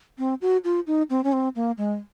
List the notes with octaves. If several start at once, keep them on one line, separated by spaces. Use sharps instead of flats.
C4
F#4
F4
D#4
C4
C#4
C4
A#3
G#3